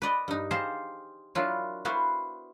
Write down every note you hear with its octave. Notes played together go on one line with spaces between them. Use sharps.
B4 D5 D#5
G2 D#4
G4 G#4 C5 F5 A5 A#5
F#3 D4 E4 F4 A#4
B3 E4 F#4 C5 F5